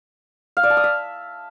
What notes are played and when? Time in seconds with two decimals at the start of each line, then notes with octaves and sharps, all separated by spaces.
0.57 F5
0.63 D5
0.70 A5
0.77 D#6
0.84 E5